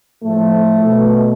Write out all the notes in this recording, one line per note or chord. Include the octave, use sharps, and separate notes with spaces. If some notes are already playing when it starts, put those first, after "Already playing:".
A2 F3 A3
B2